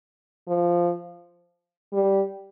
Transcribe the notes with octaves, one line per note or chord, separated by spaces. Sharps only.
F3
G3